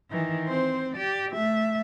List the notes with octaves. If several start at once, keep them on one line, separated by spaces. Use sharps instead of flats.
D#3 E3
C4 C5
G4 D5
A3 E5